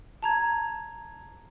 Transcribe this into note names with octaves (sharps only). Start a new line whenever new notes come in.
A5 A#5 G#6